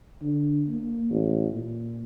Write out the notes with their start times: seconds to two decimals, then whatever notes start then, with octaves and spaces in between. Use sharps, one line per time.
0.22 D3
0.69 A#3
1.10 A1
1.53 A#2